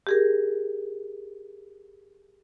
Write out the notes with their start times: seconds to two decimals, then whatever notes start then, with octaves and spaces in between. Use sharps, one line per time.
0.07 G4 G#4 A#4